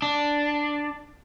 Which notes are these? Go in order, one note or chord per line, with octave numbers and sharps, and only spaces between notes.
D4